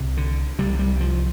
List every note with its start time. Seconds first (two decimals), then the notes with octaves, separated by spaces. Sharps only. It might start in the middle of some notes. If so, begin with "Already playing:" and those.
Already playing: C2 C3
0.17 D3
0.59 C2 C3 G3
0.79 G3
1.00 F3